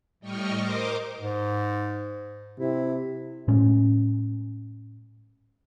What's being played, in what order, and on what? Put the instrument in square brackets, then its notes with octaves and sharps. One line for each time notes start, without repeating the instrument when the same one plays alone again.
[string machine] A2 G3 D#5 G5 C#6 F6
A#4 C5 D#5 D6
[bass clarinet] G#2
[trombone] C3 [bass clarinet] E4
[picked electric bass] A2 G#3 C#4